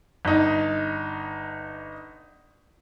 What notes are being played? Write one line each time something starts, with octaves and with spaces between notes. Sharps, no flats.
G1 D#4